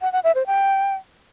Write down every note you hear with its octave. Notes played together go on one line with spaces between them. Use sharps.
F#5
F#5
E5
C5
G5